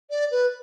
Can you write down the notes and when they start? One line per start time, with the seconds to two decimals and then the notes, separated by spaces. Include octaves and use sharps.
0.10 D5
0.31 B4